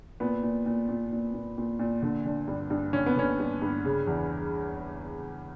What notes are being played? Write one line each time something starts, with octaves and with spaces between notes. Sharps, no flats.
A#2 B3
A#2
A#2
A#2
A#2
A#2
A#2
A#2
D3
D3
G2
G2
D3 C#4
B3
D3 C#4
G2
G2
C#3
E2